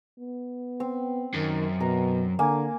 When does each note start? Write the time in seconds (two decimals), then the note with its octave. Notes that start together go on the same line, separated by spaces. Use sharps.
0.19 B3
0.80 C4
1.34 F#2 D#3
1.81 B2 A#4
2.39 D3 A#3 G#5